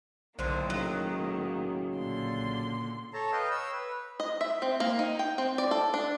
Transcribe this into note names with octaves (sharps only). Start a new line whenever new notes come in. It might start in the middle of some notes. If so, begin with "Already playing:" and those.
B1 A2 D3 D#3 A#3 C5
C#3 F#3
A#2 D3 C6
A4 C#5 A5 A#5
B4 D#5 F5 G5
C#5 E6
B4
D#5
E5
C4
A#3
D#4
G5
C4
D5
A4
D4